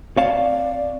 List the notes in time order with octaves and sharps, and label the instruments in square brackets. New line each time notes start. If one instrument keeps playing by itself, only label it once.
[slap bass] C4 [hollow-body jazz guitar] C#5 F5 A5 [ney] D5